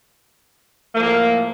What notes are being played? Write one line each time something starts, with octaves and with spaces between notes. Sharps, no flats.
A2 F3 A#3